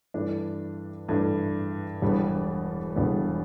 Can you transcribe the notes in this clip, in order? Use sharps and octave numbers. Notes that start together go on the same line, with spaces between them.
G2 E3 A3 D4
G2 E3 A3 D4
E1 E2 D3 G3 B3
E1 E2 D3 G3 B3